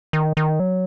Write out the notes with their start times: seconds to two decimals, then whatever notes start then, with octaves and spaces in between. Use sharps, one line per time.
0.13 D#3
0.37 D#3
0.60 F#3